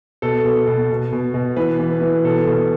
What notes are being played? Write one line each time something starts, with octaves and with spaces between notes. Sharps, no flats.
B2 A4
B2
B2
B2
B2
B2
E3 B4
E3
E3
B2 A4
B2